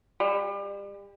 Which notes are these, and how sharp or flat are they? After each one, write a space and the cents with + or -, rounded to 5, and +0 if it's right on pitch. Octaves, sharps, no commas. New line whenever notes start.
G3 +35